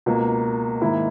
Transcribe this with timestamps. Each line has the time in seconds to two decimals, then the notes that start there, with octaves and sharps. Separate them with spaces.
0.06 C#2 B2 A#3
0.81 G#2 D#3 A#3 E4